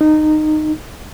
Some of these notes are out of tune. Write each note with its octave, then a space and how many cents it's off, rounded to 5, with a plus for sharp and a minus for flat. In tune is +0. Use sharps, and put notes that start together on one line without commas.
D#4 -15